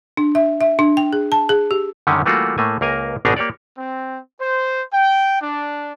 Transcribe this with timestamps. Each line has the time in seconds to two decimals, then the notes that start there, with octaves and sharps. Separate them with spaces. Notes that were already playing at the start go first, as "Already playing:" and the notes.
0.17 D4
0.35 E5
0.61 E5
0.79 D4
0.97 G5
1.13 G#4
1.32 A5
1.49 G#4
1.71 G4
2.07 F#2 D3 D#3 G3 C#4
2.26 E3 G3 A3 A#3 F4 F#4
2.58 A2 A3 A#3 G#5
2.81 C#2 A#3 A#4 G#5
3.25 G#1 B2 D4 D#4 G#4 A#5
3.37 A#3 G4 C#5 D5
3.76 C4
4.40 C5
4.93 G5
5.40 D4